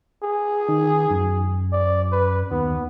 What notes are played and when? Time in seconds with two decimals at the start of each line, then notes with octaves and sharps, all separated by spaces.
0.23 G#4
0.68 D#3
1.11 F#2
1.73 D5
2.12 B4
2.51 D#2 B3